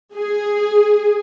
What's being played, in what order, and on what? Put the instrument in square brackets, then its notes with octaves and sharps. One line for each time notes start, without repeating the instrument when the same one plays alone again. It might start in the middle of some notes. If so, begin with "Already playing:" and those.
[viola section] G#4